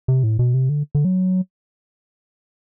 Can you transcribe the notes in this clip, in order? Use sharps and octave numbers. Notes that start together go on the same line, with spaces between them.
C3
A2
B2
C3
D3
D3
F#3